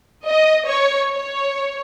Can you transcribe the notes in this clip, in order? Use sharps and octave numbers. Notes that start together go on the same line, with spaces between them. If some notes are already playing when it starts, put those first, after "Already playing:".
D#5
C#5
C#5